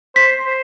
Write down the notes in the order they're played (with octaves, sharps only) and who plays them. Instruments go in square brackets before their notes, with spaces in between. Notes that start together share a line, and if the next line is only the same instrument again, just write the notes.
[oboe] C5 [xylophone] B6
[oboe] C5